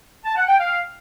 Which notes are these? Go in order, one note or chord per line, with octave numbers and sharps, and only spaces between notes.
A5
F#5
G5
F5